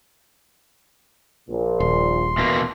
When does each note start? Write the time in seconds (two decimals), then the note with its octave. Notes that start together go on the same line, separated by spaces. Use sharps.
1.49 A#1 A#2
1.80 D#1 C6
2.38 B2 E3 A#3